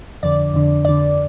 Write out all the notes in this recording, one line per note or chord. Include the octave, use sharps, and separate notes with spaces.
F2 D3 D5
F2 D3
F2 D3 D5